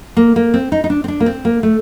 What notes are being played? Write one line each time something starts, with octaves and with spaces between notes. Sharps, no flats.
A#3
A#3
C4
D#4
D#4
D4
C4
D4
A#3
C4
A#3
A3